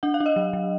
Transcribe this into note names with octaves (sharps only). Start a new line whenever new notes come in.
D4 F#5
F5
D4
D#5
F#3
F#3